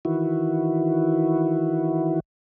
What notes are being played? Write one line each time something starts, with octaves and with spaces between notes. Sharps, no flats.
D#3 E3 E4 F#4